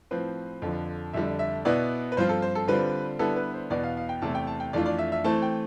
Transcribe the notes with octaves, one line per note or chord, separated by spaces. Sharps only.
A2 F3 C4 B4
F2 D3 F3
F2 D3 G3 E5
E5
B2 B3 E4 D5
B4
G2 F3 C4 F4 C5
A4
C5
A4
D3 G3 C4 F4 B4
D3 G3 B3 E4 A4
B4
C5
E2 B2 B3 D5
F5
F5
G5
E2 C3 E3 A3 E4 A5
G5
A5
G5
F2 E3 A3 D4 F4 D5
D5
E5
E5
E3 A3 C4 A5
G5